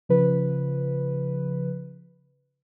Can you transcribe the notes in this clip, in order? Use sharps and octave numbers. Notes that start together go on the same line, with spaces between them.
C#3 F3 B4